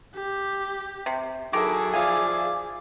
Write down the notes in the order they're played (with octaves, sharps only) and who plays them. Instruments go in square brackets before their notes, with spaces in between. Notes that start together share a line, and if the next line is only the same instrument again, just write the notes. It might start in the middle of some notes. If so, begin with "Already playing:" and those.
[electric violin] G4
[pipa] C3
[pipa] D#3 E4 [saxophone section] F#3 A4 [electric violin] G#4 [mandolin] D6
[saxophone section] F3 D5 E5 [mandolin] F5 G#5